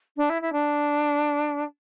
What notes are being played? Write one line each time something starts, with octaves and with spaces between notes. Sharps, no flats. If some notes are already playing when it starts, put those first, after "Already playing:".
D4
E4
E4
D4